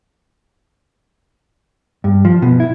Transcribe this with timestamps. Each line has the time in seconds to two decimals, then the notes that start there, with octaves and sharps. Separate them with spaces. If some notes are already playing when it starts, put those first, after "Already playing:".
2.04 G2
2.25 F3
2.42 B2
2.60 E4